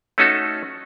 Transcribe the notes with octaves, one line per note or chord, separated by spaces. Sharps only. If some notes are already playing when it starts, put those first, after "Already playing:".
A3 C#4 D#4 F#4 A4